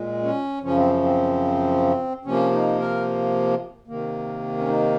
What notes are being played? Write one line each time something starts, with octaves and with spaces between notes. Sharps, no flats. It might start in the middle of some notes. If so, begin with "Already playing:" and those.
Already playing: A#2 G#3
C#4
F#2 C#3 F3 C#4
C4
C4
C3 F3 A#3 C#4
D#4
A#4
C3 D#3 A#3
C#4
D#4